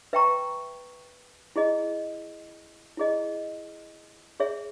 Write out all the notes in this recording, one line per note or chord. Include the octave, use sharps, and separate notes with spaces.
B4 E5 G5 A#5 C#6
E4 G#4 D#5
E4 G#4 D#5
G#4 C#5 E5